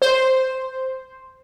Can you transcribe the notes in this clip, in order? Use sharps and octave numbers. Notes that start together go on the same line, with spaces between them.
C5